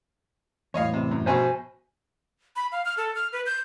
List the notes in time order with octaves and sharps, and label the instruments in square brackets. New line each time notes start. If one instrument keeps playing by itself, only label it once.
[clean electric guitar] E2 A2 [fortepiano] C#5 D#5 F5
[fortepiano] C3
F#2
[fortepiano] A#1 B2 C#6 [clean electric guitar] C5 G#5
[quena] B5
F5
F6
A4
F6
B4
G6